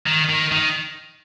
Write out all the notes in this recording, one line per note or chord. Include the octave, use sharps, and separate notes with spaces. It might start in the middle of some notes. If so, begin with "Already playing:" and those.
D#3
D#3
D#3